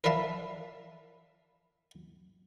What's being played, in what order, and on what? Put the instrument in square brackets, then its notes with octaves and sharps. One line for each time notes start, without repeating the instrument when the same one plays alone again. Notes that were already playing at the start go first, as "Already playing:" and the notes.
[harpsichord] A#4 B4 D5 E5 F5 A5